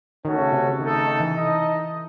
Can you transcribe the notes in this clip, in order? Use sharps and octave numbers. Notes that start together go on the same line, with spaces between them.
D#3 A3 C#4 F#4 A4
C#3
C3
C#3
D#3 A3 D#4 A4
D#3
D#3
E3
D#4 A4 D#5